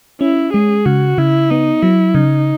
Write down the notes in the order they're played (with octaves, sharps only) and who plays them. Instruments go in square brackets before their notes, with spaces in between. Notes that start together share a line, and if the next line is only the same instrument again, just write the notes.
[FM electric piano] C#4 [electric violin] E4
[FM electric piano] G#3 [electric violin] G#4
[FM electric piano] C#3 [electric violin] F#4
[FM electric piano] C#3 [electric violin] E4
[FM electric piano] B3 [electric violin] D#4
[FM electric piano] F#3 [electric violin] E4
[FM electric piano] C#3 [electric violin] D#4